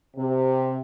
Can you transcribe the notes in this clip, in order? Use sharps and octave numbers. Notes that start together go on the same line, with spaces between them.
C3